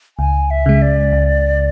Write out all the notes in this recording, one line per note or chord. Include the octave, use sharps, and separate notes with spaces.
C#2 G#5
E5
C#3 G#3
D5
C#2